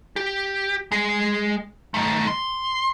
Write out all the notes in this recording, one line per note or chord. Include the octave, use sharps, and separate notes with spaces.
G4
G#3 G#4
D#3 A3
C6